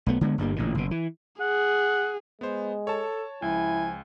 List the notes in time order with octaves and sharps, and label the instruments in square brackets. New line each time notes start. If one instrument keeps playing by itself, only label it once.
[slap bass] B1 A3 B3
D3 G#3 B3
G1 G2 G3 A#3
A1 A#2 D3
F#1 B2
E3
[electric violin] G#4 [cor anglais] F#5
[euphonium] G#3 [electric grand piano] B3 C5
[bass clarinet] A4 [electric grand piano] C#5 A5
[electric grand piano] C#2 [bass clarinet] F3 [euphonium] E4 [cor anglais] G#5